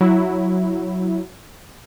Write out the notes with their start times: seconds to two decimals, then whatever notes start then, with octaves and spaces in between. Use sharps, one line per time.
0.01 F#3 E4